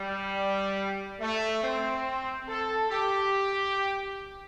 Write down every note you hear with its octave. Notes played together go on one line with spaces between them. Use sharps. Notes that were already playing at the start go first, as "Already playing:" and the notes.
Already playing: G3
A3
C4
A4
G4